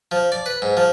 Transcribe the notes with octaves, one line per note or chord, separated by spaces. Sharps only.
F3
D5
B4
G#2
F3